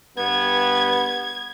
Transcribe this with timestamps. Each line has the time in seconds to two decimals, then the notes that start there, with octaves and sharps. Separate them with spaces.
0.17 G2 B3 G#6